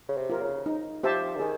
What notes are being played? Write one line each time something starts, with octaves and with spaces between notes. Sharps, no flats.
C#3
C3
F4 A#4
C#3
D#4
F3 G4 C5 E5 A5
D3
D#3 G#4